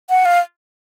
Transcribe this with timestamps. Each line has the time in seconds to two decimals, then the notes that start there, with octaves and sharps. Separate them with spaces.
0.10 F#5
0.25 F5